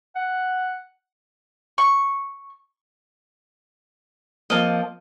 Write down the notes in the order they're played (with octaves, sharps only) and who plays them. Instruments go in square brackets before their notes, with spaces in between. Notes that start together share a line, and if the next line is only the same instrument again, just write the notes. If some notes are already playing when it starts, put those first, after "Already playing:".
[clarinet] F#5
[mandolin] C#6
[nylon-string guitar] F3 A#3 C4 [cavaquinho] D#5 F5 A5